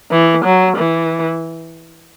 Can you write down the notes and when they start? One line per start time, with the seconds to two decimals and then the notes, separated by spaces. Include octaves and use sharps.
0.11 E3
0.45 F#3
0.77 E3